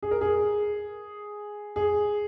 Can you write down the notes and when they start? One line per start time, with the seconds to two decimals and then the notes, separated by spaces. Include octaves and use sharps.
0.03 G#4
0.11 A#4
0.21 G#4
1.76 G#4